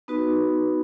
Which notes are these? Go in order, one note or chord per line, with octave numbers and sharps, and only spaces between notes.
B3 D#4 F#4 B4